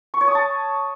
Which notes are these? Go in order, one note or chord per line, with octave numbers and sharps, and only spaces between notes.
C#6
C#5
D#6
A5